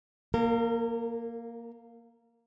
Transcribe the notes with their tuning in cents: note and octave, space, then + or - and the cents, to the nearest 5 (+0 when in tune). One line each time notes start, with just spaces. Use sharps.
A#3 +0 A#4 -35